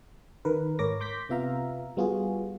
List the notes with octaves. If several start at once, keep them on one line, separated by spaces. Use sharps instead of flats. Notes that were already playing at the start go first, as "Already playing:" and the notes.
D#3 A#4 B4
G#2 A#4 C#5 D6 A#6
C6 D6 G6 A#6 B6
C3 B3 F4 E5 F5 A#5
G3 B3 F4 F#4 G#4